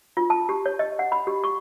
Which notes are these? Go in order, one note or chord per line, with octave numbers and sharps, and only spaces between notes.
F4
A5
G4
C#5
D#5
F#5
B5
G4
C#6